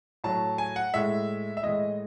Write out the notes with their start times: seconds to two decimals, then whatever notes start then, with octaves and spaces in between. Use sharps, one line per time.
0.24 A2 F#3 A5
0.58 G#5
0.76 F#5
0.94 A2 G#3 E5
1.57 E5
1.63 A2 E3 G#3 D#5